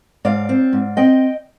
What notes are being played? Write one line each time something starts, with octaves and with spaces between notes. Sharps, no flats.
G#2 D5 F5
C4
G#2
C4 D#5 G5